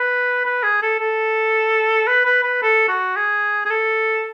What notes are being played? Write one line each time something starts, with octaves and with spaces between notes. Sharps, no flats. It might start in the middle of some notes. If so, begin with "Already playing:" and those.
Already playing: B4
B4
G#4
A4
A4
B4
B4
B4
A4
F#4
G#4
G#4
A4